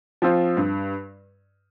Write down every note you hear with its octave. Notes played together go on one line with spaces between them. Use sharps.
F3 C4 F4
G2